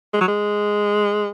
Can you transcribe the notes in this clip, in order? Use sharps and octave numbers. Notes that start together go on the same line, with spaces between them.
G#3
F#3
G#3